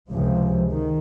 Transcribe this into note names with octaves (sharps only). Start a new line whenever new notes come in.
C#2 C3 F3 G#3
D#3